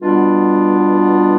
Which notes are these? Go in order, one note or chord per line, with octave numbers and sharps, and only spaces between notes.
B2 G3 B3 D4 F4